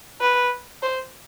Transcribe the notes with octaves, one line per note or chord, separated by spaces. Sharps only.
B4
C5